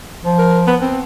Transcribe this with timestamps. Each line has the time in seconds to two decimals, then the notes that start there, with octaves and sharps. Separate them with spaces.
0.24 F3
0.39 A#4
0.67 B3
0.81 C4